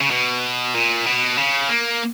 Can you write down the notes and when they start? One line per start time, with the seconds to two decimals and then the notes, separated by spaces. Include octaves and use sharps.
0.01 C#3
0.11 B2
0.75 A#2
1.06 B2
1.38 C#3
1.69 A#3